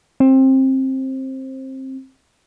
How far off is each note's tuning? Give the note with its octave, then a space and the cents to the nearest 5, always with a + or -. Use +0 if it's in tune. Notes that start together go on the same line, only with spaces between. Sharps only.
C4 +20